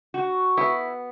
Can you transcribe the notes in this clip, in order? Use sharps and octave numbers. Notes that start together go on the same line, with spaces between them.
F#4
B3 E4